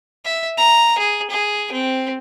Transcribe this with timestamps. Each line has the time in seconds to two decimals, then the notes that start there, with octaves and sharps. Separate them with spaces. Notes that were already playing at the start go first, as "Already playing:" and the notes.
0.25 E5
0.58 A#5
0.98 G#4
1.31 G#4
1.72 C4